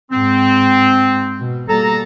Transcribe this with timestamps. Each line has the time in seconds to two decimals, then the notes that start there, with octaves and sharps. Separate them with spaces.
0.11 G#2 C4
1.40 B2
1.69 B2 G3 A#3 A4 A#5